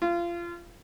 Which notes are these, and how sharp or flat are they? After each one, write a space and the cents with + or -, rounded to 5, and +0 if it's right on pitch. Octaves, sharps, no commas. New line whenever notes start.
F4 -25